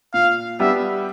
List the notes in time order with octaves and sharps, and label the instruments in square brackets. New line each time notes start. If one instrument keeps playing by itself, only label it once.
[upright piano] A#2 [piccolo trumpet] F5
[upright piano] G3 B3 D4 G4 [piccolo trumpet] E5